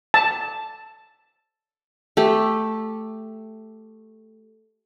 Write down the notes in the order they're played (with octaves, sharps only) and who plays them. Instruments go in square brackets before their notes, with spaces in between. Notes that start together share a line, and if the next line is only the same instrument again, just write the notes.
[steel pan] A5
[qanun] A3 G4